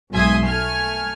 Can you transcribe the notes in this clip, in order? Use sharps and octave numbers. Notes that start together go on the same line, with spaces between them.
B1 G#2 E5 G#5 C6 D#6
A3 G#5 F6